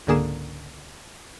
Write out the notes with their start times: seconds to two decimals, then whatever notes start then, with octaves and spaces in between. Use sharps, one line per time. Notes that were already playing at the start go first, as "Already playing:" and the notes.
0.07 C#2 G#2 D3 A#3 G#4 E7